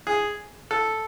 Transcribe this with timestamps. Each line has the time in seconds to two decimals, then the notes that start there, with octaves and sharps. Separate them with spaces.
0.07 G#4
0.71 A4